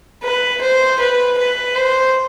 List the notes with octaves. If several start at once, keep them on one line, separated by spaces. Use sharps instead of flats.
B4
C5
B4
B4
C5